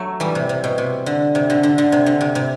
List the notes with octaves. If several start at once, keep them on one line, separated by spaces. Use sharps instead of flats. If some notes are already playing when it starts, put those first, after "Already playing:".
Already playing: F#3 A3
E3 G3
C3
C3
B2
C3
D3
C3
D3
D3
D3
C3
D3
C3
C3